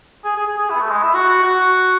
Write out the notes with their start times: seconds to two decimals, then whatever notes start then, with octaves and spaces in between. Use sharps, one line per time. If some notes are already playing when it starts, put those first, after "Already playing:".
0.25 G#4
0.36 G#4
0.47 G#4
0.58 G#4
0.70 E4
0.74 B3
0.81 A3
0.91 G#3
1.03 E4
1.14 F#4
1.28 F#4
1.43 F#4